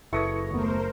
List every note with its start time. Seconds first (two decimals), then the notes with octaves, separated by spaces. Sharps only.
0.13 F#1 E4 A4 B4 C#5 D#5 C#6
0.51 D#2 A3 B3 A#4 C5